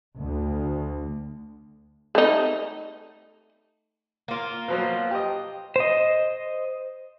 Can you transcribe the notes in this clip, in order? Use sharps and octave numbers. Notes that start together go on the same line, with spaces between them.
D2
A3 D#4
A#3 F4
B2 F3 F#3
G4 D#5
C5 D#5